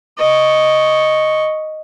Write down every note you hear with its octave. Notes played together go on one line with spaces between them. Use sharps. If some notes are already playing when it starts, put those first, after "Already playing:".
D#5 C#6